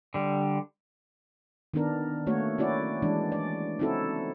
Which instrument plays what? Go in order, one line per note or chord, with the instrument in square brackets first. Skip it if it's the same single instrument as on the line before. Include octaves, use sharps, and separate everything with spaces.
[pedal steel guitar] D3 G3
[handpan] D#3 B3 D4 A#4
A3 A#3 F#4 C#5
C#4 E4 F#4 D5
E3 G#3 D4
D5
C4 C#4 D#4 E4 F#4 A4